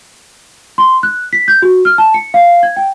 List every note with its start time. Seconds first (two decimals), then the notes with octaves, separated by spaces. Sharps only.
0.78 C6
1.03 F#6
1.33 B6
1.48 G6
1.62 F#4
1.85 F6
1.98 A5
2.14 C#7
2.34 F5
2.63 G#6
2.77 G5